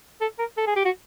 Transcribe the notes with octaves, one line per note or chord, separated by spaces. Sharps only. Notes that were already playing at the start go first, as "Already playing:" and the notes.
A4
A#4
A4
G#4
G4
F#4